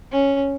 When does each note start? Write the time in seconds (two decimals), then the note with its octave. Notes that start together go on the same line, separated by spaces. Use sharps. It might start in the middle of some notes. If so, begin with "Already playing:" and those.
0.12 C#4